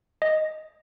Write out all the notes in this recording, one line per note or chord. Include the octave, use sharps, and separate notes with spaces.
D#5